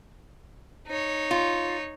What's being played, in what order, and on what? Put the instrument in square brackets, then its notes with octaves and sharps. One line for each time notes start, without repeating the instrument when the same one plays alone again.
[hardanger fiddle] D#4 C#5
[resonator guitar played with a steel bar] F4